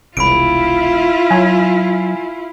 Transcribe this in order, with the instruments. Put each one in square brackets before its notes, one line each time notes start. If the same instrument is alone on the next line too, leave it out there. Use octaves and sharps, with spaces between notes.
[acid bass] E1 [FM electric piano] C2 [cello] E4 F4 [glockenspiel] B5 D7
[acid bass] F#3 [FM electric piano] G#5